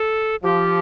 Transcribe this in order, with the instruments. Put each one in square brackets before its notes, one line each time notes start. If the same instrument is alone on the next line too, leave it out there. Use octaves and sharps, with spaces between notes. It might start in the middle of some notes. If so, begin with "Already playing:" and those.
Already playing: [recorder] A4
[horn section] F3 [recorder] G4